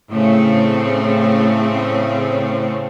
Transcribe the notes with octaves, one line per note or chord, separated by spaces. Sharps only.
A2 C#3 A3 C4